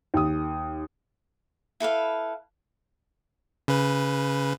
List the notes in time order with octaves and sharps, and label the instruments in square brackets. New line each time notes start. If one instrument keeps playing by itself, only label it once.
[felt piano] D#2 D#6
[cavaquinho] E4 A4 B4 F5
[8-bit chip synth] C#3 B4